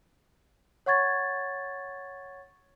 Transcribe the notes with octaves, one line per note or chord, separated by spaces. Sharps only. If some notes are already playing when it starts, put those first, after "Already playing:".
C#5 F#5 C#6 G#6 A6